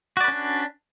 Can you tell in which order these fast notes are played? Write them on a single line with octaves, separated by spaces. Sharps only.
F#4 D5 B4 C#4 D4